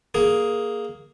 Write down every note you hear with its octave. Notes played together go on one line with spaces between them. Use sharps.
A#3 G#4